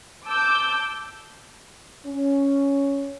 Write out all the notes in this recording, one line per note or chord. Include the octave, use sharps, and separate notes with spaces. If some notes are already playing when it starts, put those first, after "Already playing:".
A5 D6 E6 G6
C#4